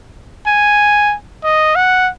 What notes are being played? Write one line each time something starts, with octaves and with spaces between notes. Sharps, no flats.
G#5
D#5
F#5